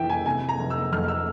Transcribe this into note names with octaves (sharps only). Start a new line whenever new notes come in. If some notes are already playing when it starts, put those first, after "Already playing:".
Already playing: F1 F2 E3 E5 G5
G#5
C3 G#5
A#5
F1
E6
F2 F6
E6